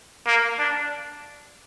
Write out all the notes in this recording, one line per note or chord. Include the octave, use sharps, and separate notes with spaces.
A#3
D4